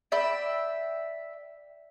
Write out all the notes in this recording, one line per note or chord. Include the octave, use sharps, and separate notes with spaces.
D5 E5 G5 B5